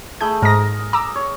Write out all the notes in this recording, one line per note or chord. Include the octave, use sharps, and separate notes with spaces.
A3 G#4 B5 G6
G#2 A#4 D#6 A#6
A#5 D6 E6
C#5